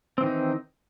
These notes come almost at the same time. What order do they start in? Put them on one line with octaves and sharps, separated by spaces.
C4 E3 D#3 D#4